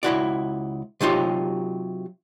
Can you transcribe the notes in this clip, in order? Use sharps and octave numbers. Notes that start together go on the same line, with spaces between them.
C#2 E4 F#4 D5
C3 F#3 D#4 F4 G4